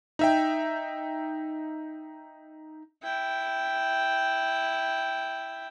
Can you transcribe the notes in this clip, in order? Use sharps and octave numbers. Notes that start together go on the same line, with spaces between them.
D#4 E5 G5
E4 G5